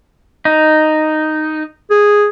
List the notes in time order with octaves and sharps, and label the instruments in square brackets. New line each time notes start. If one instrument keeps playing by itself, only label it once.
[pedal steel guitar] D#4
[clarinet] G#4